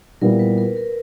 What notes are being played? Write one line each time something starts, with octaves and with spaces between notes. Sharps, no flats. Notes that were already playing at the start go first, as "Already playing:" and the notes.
A#2 G3 B3 E4 G4 A#4
B4
A#4
A#4